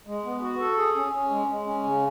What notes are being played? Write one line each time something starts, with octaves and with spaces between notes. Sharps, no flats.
G#3
B3
F#4
A4
G#4
C#4
C#4
G#3
G#3
C#4
C#3